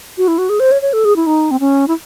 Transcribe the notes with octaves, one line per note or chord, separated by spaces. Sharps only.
F#4
E4
F#4
G#4
C5
C#5
C#5
A4
G#4
E4
D#4
C4
C#4
E4